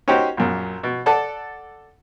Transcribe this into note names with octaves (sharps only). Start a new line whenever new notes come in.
C#4 D#4 F#4 G4 C5
A#1 F#2
B2
A4 D5 F#5 A5